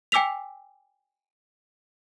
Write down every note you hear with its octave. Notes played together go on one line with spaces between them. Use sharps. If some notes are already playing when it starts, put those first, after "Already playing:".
G5 G#5 D6 E6 B6 F7